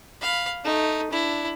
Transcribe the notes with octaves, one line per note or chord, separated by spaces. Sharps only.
F5 B5
A3 D#4
D4 E4